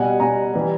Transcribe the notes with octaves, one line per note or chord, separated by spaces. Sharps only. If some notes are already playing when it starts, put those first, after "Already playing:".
Already playing: B2 G3 F#5 G#5
B2 G3 G#5 A#5
E3 G3